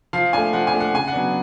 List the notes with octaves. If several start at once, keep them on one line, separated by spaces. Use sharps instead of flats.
F3 F5
A3 D4 G#5
F3 F#5
G#5
A3 D4
F#5
C#3 G#5
F#5
F#3 B3 D4